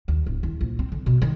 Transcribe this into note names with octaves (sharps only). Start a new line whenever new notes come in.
D#2
D1
E2
A#1
C4
D3
B2
D#3